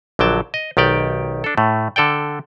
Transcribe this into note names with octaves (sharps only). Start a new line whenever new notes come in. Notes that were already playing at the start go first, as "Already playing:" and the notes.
A#1 D3 F#3 G5 A5
D#5
B1 D#3 G4 D5 G5
D4 A4
A2 A3
D3 A4 D5 G5